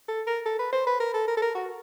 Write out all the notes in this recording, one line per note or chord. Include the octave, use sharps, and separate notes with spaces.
A4
A#4
A4
B4
C5
B4
A#4
A4
A#4
A4
A#4
F#4